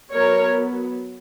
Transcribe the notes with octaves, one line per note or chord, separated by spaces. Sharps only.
F#3 B3 A#4 C#5